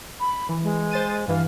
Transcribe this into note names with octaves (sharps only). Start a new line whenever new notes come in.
B5
E3
G#3
C5 A6 D#7
G2 E3 F5